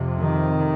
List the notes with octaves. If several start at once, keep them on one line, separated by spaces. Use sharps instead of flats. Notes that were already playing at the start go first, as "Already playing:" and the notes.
Already playing: F2 C3
D#3